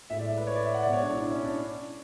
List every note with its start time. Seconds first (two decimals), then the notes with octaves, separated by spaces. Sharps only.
0.10 A2 G#3 E5
0.19 D5
0.37 B4
0.47 C#5
0.56 D5
0.65 E5
0.74 F#5
0.83 G#3 D5
0.87 B2
0.93 C#5
1.02 D4
1.10 E4
1.20 D4
1.32 C#4
1.45 D4